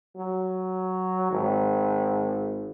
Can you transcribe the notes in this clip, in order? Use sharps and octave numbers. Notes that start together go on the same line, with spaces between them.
F#3
G#1